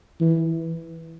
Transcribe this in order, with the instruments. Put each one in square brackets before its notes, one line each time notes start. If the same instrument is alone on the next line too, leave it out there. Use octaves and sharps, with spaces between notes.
[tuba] E3